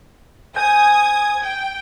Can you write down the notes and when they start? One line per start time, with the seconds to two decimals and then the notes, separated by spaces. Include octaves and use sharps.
0.56 C5 G#5 D#6 G6 G#6
1.41 G5